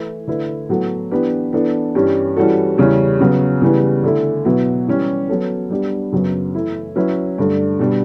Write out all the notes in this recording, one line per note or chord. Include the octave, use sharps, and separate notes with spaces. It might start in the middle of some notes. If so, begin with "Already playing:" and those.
Already playing: E3 A3 E4 B4
D3 A3 E4 B4
A2 F#3 B3 F#4 A4
E3 B3 D4 G4 B4
E3 B3 D4 A4
G2 E3 G3 C#4 G4
E3 G3 C#4 F#4 A4
E2 C#3 G3 C#4
C#3 F#3 B3
C#3 E3 G3 B3
D3 A3 E4
B2 F#3 B3 E4
E3 G3 C#4 G4
F#3 B3 F#4 A4 C#5
G3 B3 D4 G4 B4
F#2 C#3 F#3 B3
E3 A3 E4
F#3 C#4 E4 B4
G2 D3 A3 D4
B2 G3 D4